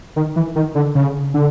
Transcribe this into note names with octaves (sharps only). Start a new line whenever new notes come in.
D#3
E3
D#3
D3
C#3
D3